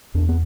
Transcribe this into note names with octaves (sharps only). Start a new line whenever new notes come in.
E2 D4
B3